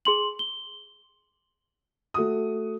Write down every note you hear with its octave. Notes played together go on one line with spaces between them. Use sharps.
G#4 C6 F#7
G7
A3 F#4 D#6